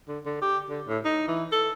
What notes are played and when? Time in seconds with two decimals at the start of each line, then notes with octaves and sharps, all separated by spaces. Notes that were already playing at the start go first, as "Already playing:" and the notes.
0.08 D3
0.26 D3
0.42 G4
0.70 D3
0.88 A2
1.05 D#4
1.28 E3
1.52 A4